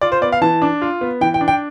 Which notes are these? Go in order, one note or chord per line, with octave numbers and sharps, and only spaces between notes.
F4 D5
C5
B3 D5
F5
E3 A5
D4
F4
B3
E3 G5
G5
D4
G5